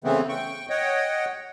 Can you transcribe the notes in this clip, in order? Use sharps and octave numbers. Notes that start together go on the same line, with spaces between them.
C#3 E3 A3 B3 C4
G5 C#6
C#5 D#5 F#5 G5